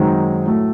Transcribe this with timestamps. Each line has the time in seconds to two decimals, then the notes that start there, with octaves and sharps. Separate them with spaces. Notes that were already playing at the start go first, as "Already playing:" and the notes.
Already playing: F#2 D#3 G#3 C4 D#4
0.46 A2 F#3 A3